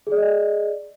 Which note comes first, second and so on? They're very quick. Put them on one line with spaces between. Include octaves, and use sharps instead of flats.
G#4 D5 D#5